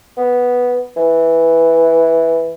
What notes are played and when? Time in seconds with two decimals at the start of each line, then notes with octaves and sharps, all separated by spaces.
0.17 B3
0.97 E3